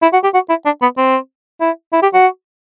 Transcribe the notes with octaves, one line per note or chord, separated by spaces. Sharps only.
E4
F#4
G4
F#4
E4
D4
B3
C4
E4
E4
G4
F#4